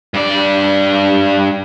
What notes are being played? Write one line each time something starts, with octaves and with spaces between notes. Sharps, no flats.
G2 D5